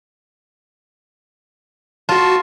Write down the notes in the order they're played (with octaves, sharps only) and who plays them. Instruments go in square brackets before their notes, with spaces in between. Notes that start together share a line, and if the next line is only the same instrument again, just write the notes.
[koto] F4 [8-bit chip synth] F#4 A5